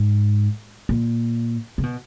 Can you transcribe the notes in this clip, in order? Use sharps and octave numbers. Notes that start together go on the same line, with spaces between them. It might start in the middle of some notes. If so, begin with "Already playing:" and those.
Already playing: G#2
A#2
C3
B2